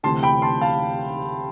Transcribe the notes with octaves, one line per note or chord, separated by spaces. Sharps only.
D2 C3 E3 A5 C6
G5 B5
A5 C6
F5 A5